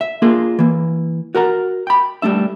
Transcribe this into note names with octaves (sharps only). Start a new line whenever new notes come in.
E5
A#3 D4 F4 G#4 A#4
E3 A#3
F#4 A#4 F#5 A#5
G5 B5
G3 A3 D4 E5